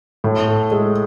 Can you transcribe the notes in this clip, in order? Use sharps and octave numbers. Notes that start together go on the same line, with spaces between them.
A2
A4
G#3